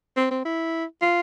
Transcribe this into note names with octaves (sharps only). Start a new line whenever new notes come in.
C4
C4
E4
F4